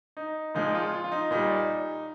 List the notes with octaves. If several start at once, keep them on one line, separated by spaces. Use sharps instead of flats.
D#4
A#2 F3 G#3 D#4
F4
F4
F4
D#4
A#2 G3 D#4